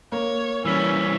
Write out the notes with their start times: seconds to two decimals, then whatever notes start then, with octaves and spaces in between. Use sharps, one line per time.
0.12 A#3 C#5
0.65 E3 G3 C#4 E6 B6